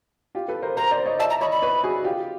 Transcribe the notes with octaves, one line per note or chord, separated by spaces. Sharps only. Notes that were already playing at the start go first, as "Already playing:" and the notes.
F4 G4
A4 B4
A#4 C5
A#4 C5 A#5
C5 D5
C#5 D#5
D5 E5 A5
A#5
C#5 D#5 B5
B5
B4 C#5
F#4 G#4
F4 G4